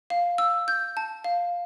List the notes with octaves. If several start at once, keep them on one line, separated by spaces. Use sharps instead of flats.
F5
E6
G6
A5
F5